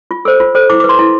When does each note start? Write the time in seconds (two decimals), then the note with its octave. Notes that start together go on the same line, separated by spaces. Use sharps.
0.11 F4
0.25 A4 C5 E6
0.40 F4
0.55 A4 C5
0.70 E4 D6
0.80 B4 D6
0.89 C6
0.99 E4